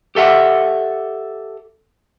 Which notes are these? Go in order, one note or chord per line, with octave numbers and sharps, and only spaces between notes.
G4 A4 E5 F#5